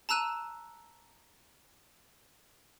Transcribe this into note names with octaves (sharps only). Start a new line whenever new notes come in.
A5 A#5 E6 F#6 D#7 E7